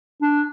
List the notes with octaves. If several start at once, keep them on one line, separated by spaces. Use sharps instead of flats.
D4